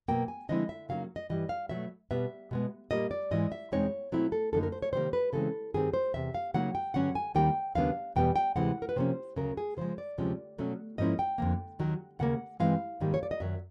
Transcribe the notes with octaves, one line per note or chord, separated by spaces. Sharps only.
B2 F#3 A#3 G5
G#5
D3 F3 G#3 C4 E4 D#5
E5
C#3 F#3 A#3 D#4 F5
D#5
G2 E3 G3 D#5
F5
B2 F#3 A3 E5
B2 G3 B3 E5
B2 G#3 B3
A#2 G3 A#3 D#5
D5
G#2 E3 G#3 D#5
E5
E2 B2 G#3 C4 D#4 C#5
B2 F#3 A3 C4 E4
A4
F#2 D3 G3 A#3 D#4 A4
A#4
C5
C#5
C3 D#3 G3 A#3 C5
B4
C#3 E3 G#3 C4 A4
G2 D#3 G3 C4 G#4
C5
E2 C3 E5
F5
C#3 F#3 A#3 D#4 F#5
G5
G2 D3 F#3 C#4 F#5
G#5
D#2 D#3 G3 A#3 G5
D#2 C#3 F#3 B3 D4 F5
E2 B2 G3 B3 G5
G5
D2 C3 E3 G#3 C4 F#5
A#4
B4
C3 F3 A#3 C#4 C5
D2 C#3 F#3 A#4
G#4
C#3 F3 G#3 C5
D5
D2 C3 F3 G#3 C#4
B2 F#3 A3 C#4
G#2 F3 A#3 C#4 E4 D#5
G5
F2 D3 F#3 A#3
D#2 D#3 F#3
D#2 C#3 A#3 F#5
G2 E3 G#3 C4 E4 F5
G#2 D#3 G3 A#3
C#5
D5
D#5
F#2 D#3 F#3 E5